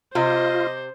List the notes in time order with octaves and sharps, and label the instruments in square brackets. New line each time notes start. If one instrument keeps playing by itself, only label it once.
[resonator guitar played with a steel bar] C3 [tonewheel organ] F4 [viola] C5 [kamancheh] D#5